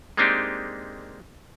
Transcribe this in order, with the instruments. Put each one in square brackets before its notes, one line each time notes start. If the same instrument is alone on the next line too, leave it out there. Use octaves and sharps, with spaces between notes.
[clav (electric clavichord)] G#3 A#3 C4 D4 D#4 G4